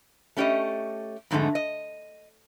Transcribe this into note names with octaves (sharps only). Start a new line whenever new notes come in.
A3 C#4 G4 D5 D#5
F2 G#2 D3 G#3 A3
D#5